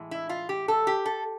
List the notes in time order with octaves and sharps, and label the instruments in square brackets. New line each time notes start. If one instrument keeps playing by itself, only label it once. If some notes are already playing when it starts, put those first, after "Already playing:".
Already playing: [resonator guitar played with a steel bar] A2 E3 G#3
E4
F4
G4
A4
G4
A4